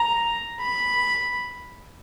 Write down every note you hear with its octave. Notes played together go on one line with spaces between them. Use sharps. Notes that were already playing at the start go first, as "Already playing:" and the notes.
Already playing: A#5
B5